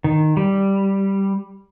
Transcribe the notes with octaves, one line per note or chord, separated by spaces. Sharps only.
D#3
G3